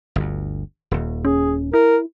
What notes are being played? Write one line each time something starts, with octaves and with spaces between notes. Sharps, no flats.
G1 D2
D#1 D#2
C#4 G#4
E4 A#4